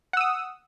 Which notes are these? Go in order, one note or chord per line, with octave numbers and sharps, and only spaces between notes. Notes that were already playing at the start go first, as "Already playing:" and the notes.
F#5 D#6 E6